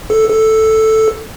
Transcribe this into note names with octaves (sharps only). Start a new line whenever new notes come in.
A4
A4